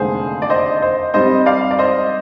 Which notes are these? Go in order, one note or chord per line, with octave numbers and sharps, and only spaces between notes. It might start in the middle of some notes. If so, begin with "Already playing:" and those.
Already playing: F1 D#2 D3 G#3 G#4 C5
D5
C5 D#5
C5 D#5
G#2 G3 C4 C5 D#5
D5 F5
D5
C5 D#5